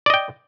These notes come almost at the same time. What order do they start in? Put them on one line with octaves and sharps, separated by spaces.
D5 D#5 G5